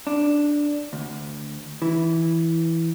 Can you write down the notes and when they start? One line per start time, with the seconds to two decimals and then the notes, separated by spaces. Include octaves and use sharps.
0.07 D4
0.93 D2
1.82 E3